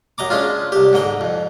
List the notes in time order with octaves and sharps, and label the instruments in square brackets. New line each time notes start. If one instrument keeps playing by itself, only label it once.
[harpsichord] F#2 D#5 A#5 D6
G#3 C#4 D4 F4
C2 G4
G#2 D3 D#5 G5
F2